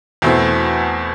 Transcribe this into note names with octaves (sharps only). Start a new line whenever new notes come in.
E2 B2 A3 C4 E4